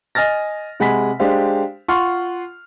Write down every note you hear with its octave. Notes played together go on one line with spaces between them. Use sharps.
D#5 G#5 F6 A6 A#6
C3 G#3 F#5 G#5 B5 B6
G#3 D4 G4 C5 F5
F4 F#5 C6 C#6 F6